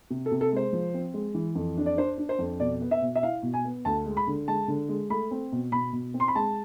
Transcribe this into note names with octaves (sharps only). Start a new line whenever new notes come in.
C3
A4
C3
A4
G#3 C5
F3
C4
G#3
E3
F2
D4
D5
D4 C5
D4
C5
F2
B2 D5
B3
E5
B2
E5
E4 F5
B2
G#5
B3
D2 A5
G#3
B5
D3
G#3 A5
D3
G#3
A3 B5
C4
B2
B2 B5
B2
C4
C6
B5
G#3 A5